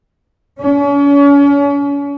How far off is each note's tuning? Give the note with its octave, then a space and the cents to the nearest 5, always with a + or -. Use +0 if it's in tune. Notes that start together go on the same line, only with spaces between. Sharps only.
C#4 +40